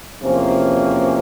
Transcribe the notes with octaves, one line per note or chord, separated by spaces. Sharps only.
E2 C3 F3 A#3 C#4